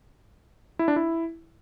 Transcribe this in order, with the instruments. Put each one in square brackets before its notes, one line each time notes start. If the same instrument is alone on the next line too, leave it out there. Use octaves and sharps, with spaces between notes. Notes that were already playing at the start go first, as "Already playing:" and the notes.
[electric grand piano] E4
D4
E4